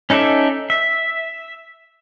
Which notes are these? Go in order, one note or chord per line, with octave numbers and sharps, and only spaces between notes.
C#4 D#4 A4 D5 E5
E5